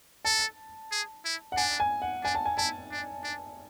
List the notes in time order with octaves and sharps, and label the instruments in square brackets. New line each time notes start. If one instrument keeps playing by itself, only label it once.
[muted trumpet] A4 [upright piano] A5
[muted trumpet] G#4
E4
[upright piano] F#5
[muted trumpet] D4 [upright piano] G#5
[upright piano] G#5
F#5
[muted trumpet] D4 [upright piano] G#5
[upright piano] A5
G#5
[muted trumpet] E4 [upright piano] A5
[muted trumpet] D4
D4